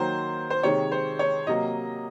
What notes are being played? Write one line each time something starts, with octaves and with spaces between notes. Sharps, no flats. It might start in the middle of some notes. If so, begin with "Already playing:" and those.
Already playing: D#3 F#3 A#3 C5
C5
C3 D#3 G#3 C#5
C5
C#5
C3 F#3 A#3 D#5